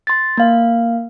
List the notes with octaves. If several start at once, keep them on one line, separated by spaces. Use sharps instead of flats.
C6 A6
A#3 F5